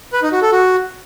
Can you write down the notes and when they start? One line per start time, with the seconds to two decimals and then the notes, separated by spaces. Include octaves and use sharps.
0.13 B4
0.23 D#4
0.32 F#4
0.42 A4
0.52 F#4